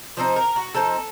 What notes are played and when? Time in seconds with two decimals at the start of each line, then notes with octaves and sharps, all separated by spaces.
0.17 F3 C4 D#4 C5
0.36 A#4
0.56 F#4
0.75 F3 C4 D#4 A4